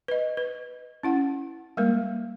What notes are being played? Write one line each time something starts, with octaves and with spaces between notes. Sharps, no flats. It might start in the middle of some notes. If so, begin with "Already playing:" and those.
B4 D#5
B4
C#4 E4 F#5
G3 G#3 A#3 A#4